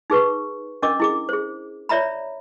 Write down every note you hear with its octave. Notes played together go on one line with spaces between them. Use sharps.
D#4 G#4 B4 C#6
C#4 D4 A#4 D#5 D6
E4 G#4 D6
G#4 C5
C#5 D5 E5 A#5 B5